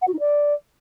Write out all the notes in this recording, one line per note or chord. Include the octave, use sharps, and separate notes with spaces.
F#5
F#4
D#4
D5